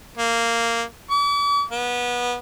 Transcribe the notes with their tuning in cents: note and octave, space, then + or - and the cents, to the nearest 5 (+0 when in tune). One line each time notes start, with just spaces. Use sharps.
A#3 -10
D6 -45
B3 -20